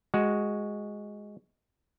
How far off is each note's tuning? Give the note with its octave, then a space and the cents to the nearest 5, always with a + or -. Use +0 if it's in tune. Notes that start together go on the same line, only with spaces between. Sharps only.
G#3 +0 F#4 +5